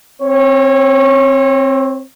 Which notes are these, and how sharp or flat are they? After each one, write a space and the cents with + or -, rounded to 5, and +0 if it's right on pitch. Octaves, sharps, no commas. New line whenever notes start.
C4 +15 C#5 -20